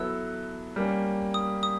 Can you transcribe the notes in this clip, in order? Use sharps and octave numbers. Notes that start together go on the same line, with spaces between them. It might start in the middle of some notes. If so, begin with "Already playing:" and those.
Already playing: F#3 B3 E4 A4 E6
G3 A#3 C#4
D#6
D#6